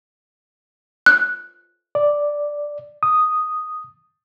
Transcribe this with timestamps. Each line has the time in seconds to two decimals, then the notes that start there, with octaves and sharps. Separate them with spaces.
1.06 F#6
1.95 D5
3.03 D#6